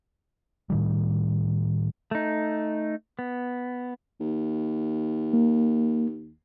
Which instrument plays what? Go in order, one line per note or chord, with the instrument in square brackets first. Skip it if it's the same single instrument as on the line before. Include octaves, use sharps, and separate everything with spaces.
[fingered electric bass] A2 D#3 G3
[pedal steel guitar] A3 D#4
B3
[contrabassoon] D#2
[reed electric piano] A#3